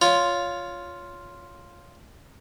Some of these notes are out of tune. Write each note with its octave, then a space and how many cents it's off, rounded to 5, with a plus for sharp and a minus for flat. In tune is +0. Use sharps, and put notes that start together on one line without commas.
F4 +0 C#5 +20